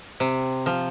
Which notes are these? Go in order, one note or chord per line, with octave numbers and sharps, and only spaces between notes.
C3
F3